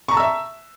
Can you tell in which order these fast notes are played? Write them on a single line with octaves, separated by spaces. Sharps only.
C#6 A#5 A5 E6 E5